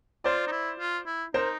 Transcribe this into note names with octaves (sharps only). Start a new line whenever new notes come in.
F4 C5 D5
D#4
E4
F4
E4
D#4 A#4 C5